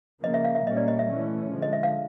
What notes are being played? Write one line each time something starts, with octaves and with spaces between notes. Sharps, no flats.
C#3 F3 A#3 D#5
E5
F5
E5
A#2 G3 A#3 C#4 D#5
D5
D#5
E5
E3 A3 C#4
D3 F3 G#3
D#5
E5
F5